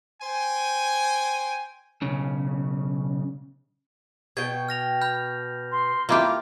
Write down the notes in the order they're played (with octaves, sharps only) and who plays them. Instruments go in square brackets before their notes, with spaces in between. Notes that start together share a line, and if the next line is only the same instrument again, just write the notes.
[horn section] C5 G5 G#5
[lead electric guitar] B1 C#3
[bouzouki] B2 G5 [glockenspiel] G#6
[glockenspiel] F6 A#6 F7
B5 F6 G6
[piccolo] C6
[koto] A#3 E4 G4 [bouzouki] F4 [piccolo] D6